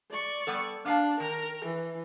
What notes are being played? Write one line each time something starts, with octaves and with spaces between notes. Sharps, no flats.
D5 C#6
G3 B3 A4
A#3 D4 F5 A5
D#3 A#4
E3